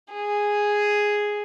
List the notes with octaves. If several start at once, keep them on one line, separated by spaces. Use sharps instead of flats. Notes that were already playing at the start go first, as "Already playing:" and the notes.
G#4